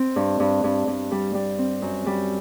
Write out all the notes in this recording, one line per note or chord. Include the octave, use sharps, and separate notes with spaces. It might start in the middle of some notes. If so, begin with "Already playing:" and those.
Already playing: C4
G2
G2
G2
G2
G3
G3
C4
F#2
G3